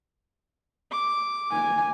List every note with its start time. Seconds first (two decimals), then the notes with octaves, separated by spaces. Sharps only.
0.91 D6
1.52 G#5